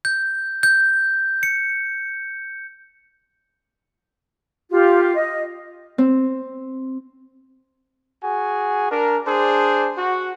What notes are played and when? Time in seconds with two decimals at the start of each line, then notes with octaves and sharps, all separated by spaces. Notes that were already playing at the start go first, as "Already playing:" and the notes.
0.05 G6
0.63 G6
1.43 C#7
4.71 F4 G4
5.15 D#5
5.98 C4
8.24 F#4 G#4 G#5
8.91 D4 A#4
9.27 D4 G#4 C5
9.98 F#4